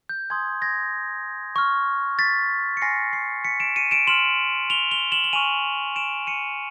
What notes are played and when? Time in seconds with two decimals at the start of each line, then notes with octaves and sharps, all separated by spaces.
0.09 G6
0.30 G#5 C6 D#6 G#6
0.62 G#6 A#6
1.56 C#6 F6
2.19 A6 B6
2.77 C#7
2.81 G#5 C6 F6 A#6 C7
3.13 A#6 C7
3.45 B6 C#7
3.60 D7 E7
3.76 C#7 D#7
3.91 D7 E7
4.07 C6 F6 E7 F#7
4.70 F7 G7
4.91 F7 G7
5.12 E7 F#7
5.24 F#7
5.33 G#5 C#6 F6 D#7 F7
5.96 D7 E7
6.27 C#7 D#7